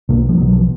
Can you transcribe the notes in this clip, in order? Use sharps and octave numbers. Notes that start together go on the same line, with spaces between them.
B1 B2 A#3
F3
B1 B2 F#3
F3